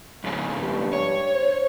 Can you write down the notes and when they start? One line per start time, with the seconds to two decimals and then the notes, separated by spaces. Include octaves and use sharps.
0.24 F2 G#2 C#3
0.56 G2
0.93 C#5
1.33 C5